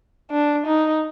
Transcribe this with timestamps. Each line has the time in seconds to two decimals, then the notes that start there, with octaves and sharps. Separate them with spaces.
0.31 D4
0.66 D#4